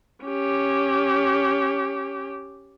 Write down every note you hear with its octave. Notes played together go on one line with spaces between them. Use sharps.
C#4 G4